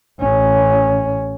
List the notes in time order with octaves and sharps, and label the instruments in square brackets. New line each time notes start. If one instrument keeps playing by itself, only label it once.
[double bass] A1 C#4